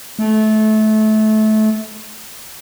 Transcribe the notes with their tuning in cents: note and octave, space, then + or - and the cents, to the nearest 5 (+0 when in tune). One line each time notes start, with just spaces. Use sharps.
A3 -25